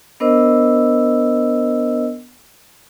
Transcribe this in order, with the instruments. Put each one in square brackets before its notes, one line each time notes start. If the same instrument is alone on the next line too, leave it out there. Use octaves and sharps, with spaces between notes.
[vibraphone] B3 D4 A#4 C5 D#5 E6